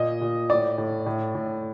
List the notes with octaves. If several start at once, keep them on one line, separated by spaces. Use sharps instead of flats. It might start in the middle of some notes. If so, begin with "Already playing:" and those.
Already playing: A#2 D#5
A#2
A2 D5
A2
A2
A2